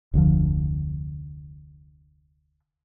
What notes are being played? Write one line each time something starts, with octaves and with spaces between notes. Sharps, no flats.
F1 D2 D3 F3